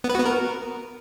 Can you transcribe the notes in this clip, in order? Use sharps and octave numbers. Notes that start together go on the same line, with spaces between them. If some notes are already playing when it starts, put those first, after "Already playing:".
B3
B4
F#4
B3
A#4